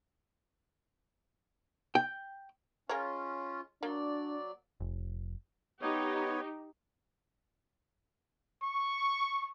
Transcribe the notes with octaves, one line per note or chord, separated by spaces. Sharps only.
G5
G#3 C#4 F4 A#4 C#5
F#3 A#3 D4 D5
F1
B3 D#4 G4 C#5
C#6